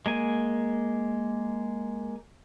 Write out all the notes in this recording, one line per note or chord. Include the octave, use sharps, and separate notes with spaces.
G#3 A#3 G#5